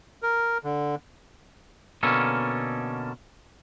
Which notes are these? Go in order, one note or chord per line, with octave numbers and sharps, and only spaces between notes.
A#4
D3
B2 D3 A#3 C#4 A4